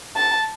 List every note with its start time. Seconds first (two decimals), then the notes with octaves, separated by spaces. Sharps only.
0.16 A5